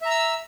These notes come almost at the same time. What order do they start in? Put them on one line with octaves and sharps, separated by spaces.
E5 A#5 E6